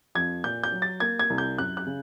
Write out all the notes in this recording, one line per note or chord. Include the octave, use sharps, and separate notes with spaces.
F2 G#6
A#2 G6
G6
F#3
A6
A#3 G#6
G#6
C2
G6
F#2 F#6
F#6
C#3